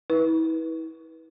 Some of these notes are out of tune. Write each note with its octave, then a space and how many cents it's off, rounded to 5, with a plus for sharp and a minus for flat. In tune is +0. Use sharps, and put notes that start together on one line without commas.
E4 -35 B4 -25